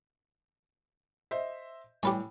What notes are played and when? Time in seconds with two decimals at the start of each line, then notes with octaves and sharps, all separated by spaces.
1.31 C5 D#5 E5
2.03 A2 G3 G4 B4 C#5 G#5 B5